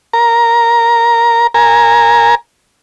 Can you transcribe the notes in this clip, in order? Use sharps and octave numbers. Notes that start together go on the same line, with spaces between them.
A#4 A#5
A#4 G#5 A#5